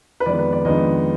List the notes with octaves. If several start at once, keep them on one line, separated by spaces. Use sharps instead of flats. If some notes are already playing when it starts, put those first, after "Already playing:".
B4
F2 D#3 G#3 B3 D5
B4
D5
F2 D#3 G#3 B3 D4 D#5